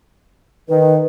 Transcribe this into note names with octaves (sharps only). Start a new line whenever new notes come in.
D#3 B4